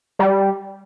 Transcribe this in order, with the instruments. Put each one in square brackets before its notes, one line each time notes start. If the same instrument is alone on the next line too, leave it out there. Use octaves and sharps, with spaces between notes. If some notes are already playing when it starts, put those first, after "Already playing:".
[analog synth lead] G3